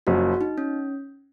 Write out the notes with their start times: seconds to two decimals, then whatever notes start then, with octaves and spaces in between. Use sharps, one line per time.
0.07 F#1 F#2 F3 F#4
0.41 D#4
0.58 C#4